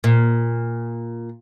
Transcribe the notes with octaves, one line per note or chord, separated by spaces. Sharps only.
A#2